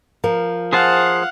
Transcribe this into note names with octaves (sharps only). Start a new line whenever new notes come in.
F3 A#4
G#4 C5 F5 F#5 A5